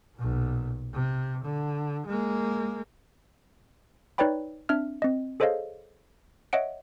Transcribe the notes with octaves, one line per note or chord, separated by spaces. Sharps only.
B1 A#2
C3
D3
G#3 A#3
D#4 B4 C#5 D5 G5 B5
C4 D4 E5 F6
C4 D#5
G#4 A4 C5 C#5 D#5 F5
C#5 D#5 E5 F#5 D7